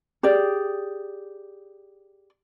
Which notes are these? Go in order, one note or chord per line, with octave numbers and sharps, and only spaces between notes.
G4 G#4 D5